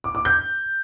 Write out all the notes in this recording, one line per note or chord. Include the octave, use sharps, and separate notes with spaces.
D6
D6
G6